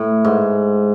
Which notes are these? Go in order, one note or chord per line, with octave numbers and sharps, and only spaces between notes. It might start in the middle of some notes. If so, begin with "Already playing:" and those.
Already playing: A2
G#2